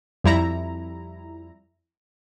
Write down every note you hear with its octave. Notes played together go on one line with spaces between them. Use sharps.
F2 G3 E4 A#5